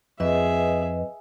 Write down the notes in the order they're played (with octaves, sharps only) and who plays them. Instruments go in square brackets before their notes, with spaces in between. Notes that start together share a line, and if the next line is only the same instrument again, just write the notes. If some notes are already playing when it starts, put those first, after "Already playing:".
[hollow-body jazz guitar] F2 [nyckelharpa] G#4 E5 [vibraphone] B4 D#5